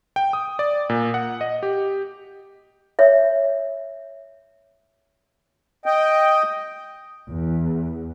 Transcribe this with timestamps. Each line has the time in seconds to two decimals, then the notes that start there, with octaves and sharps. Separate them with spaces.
0.16 G5
0.33 D#6
0.59 D5
0.90 A#2
1.14 F#5
1.41 D#5
1.63 G4
2.99 C#5 E5
5.86 D#5 G5
7.29 E2